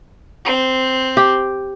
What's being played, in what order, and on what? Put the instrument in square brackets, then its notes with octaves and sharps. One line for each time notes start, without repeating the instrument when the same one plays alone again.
[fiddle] C4
[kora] G4